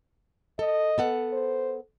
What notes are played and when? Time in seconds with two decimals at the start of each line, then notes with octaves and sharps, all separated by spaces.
0.59 A4 D#5
0.98 B3 A4 F#5
1.33 C5